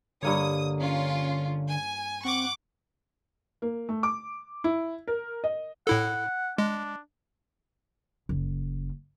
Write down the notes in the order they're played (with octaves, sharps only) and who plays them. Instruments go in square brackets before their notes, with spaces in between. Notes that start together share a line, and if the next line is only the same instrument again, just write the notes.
[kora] G2 A#3 C#5 [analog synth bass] D3 [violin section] D#6
[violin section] C#4 F4
G#5
[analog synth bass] C4 [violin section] F#5 C#6 D6
[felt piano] A#3
A3
D6
E4
A#4
D#5
[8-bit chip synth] A2 E4 A4 [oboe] F#5
[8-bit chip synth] G#3 [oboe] D4
[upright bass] F#1